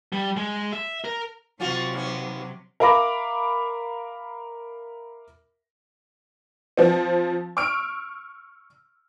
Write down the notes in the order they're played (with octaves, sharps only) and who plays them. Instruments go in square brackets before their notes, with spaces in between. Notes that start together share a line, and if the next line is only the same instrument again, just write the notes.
[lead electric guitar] G3
G#3
E5
A#4
[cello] C3 F#3 [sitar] C#4 F4 F#4
[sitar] D#2 B3 C#4
[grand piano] A#4 E5 F5 B5 D6 A#6
[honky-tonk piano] F3 C4
C#6 E6 F6 D7